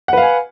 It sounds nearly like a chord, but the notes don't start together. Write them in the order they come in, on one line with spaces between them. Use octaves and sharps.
F#5 B4 F5 G#5